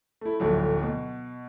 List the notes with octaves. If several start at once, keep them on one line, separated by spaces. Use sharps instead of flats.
A3 E4
D1 A#1 F#3 A3
B2